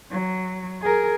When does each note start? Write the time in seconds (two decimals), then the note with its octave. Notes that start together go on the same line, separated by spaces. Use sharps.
0.11 F#3
0.82 G#4 A#4